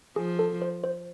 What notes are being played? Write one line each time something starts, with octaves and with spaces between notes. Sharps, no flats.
F3 G#4
A4
C5
C5